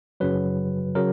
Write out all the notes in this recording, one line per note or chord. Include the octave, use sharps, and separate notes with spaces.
F#2 C#3 F#3 B4
C#3 F#3 A#4